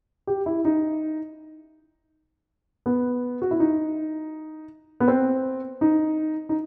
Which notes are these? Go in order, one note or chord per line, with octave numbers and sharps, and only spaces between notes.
G4
E4
D#4
B3
F#4
E4
D#4
B3
C4
D#4
D#4